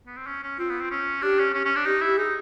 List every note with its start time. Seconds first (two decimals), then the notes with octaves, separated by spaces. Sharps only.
0.06 B3
0.16 C4
0.27 C#4
0.43 C#4
0.58 C4 F4
0.70 B3
0.80 C4
0.91 C#4
1.22 D4 G4
1.39 C#4
1.54 C#4
1.65 C#4
1.76 D4
1.85 D#4 G4
2.01 E4 G4
2.18 D#4 G#4